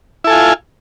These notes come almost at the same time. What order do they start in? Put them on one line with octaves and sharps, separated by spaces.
E4 A4 G#5 F4